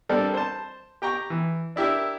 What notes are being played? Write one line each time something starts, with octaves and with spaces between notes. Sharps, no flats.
G3 C4 D4 A4 A#4
C5 A5
G4 G5 A#5 C#6
E3
D4 E4 G4 A#4 E5